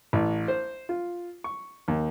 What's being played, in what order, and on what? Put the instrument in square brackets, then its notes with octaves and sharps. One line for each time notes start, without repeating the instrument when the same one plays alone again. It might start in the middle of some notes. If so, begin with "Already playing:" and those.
[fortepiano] A1
C5
F4
C#6
D#2